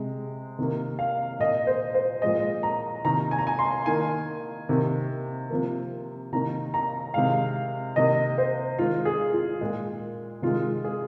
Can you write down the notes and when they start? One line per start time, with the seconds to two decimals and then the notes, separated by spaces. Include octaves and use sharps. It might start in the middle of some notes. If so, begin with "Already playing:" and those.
Already playing: C3 G#3
0.59 C3 D#3 A#3
0.99 F5
1.40 A#2 A#3 D#5
1.67 C5
1.95 C5
2.22 A#2 F3 G#3 D#5
2.63 A#5
3.05 C3 D#3 A#3 A#5
3.31 G#5
3.39 A#5
3.47 G#5
3.59 C6
3.86 D#3 A#3 G#5
4.69 C3 D#3 A#3
5.50 C3 F3 A#3
6.32 C3 D#3 A#3 A#5
6.74 A#5
7.14 C3 D#3 G#3 F5
7.96 C3 D#3 A#3 D#5
8.38 C5
8.78 D#3 G#3 F4
9.05 G#4
9.33 F4
9.61 A#2 G#3
10.42 C3 D#3 G#3 F4
10.84 G#4